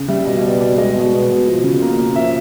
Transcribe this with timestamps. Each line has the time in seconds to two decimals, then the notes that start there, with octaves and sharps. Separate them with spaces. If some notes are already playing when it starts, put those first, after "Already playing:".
Already playing: C#3
0.08 G3 E5
0.25 B2 D#5
0.43 B3 D5
0.60 B2 D5
0.77 G#3 D#5
0.95 B2
1.12 B3
1.30 B2
1.47 F3
1.63 C#3
1.82 A#3
1.98 C#4
2.16 F3 E5